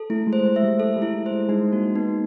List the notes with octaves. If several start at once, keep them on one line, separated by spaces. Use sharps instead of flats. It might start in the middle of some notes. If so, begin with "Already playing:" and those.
Already playing: A4
A3 E4
G#3
C5
G#3
E5
G3
A4
G3
E4
C5
G#3
G#3 D#4
A#3 F#4
B3 D#4